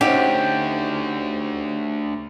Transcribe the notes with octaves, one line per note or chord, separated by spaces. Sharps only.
D2 D3 C#4 D#4 G4 C5 F5 F#5